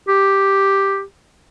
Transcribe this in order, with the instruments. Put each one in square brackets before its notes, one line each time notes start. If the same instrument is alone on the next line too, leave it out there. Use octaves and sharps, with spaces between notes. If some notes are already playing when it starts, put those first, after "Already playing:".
[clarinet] G4